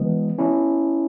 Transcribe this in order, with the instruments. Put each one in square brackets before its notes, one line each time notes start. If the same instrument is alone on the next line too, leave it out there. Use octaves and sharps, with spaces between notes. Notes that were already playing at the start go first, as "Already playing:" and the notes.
Already playing: [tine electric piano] E3 G#3 [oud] B3
[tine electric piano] C#4 E4